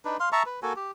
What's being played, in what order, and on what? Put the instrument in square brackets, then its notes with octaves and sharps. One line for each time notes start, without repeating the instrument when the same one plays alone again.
[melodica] D4 D#4 B4
F5 C6
E5 A5 A#5 C#6
B4
A#3 F#4 A4 G#5
G4